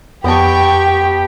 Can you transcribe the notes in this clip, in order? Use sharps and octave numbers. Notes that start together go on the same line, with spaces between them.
F2 B3 G4 D#5 G5 A5 C#6